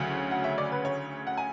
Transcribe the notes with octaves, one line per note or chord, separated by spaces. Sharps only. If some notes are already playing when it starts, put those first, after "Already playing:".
Already playing: D2 C#3 F#3 C#4 F#4
F#5
E5
D5
B4
C#5
F#5
G#5